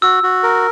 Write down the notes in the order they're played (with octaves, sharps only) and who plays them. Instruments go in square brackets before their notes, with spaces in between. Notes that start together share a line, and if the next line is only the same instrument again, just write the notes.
[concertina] F#4 [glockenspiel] E6
[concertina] F#4
A#4